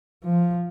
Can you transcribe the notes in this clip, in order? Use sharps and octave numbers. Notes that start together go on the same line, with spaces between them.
F3